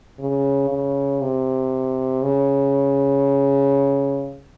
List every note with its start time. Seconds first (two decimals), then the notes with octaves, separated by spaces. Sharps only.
0.19 C#3
0.69 C#3
1.21 C3
2.23 C#3